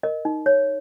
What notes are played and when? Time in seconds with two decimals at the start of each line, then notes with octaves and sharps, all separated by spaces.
0.03 A#4 D#5
0.25 D#4
0.46 C#5